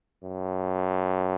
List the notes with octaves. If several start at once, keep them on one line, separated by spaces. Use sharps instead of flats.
F#2